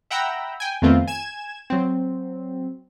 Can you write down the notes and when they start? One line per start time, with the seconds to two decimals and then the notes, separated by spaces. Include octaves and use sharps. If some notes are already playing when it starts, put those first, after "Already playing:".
0.11 E5 F#5 G5 A#5 B5 E6
0.60 G5 G#5
0.82 F2 D#3 A3 B3 C4 F4
1.08 G#5 G#6 E7
1.70 F#3 C4